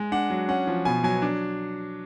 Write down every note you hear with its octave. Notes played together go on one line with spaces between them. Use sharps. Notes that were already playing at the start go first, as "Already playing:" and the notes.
Already playing: G#3
D4 F#5
F#3
C#4 F#5
F3
B2 G#5
F#3 G#5
D4